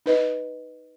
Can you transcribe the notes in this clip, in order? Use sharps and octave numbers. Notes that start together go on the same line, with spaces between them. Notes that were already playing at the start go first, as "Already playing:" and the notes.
D#4 B4 D#5